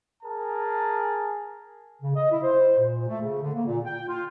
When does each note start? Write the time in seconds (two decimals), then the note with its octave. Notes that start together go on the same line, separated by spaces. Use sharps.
0.23 G#4 A#4 A5
2.02 C#3
2.16 D#5
2.30 E4
2.43 C5
2.79 A#2
3.08 A3
3.21 C#3
3.42 D3
3.54 A#3
3.65 A#2
3.85 G5
4.08 F4